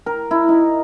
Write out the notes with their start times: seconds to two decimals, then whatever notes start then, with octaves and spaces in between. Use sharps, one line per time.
0.06 A#4
0.31 E4
0.49 D#4